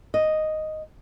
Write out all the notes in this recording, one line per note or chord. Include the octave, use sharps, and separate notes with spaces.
D#5